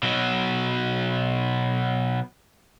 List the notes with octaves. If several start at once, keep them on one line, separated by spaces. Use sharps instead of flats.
B2 F#3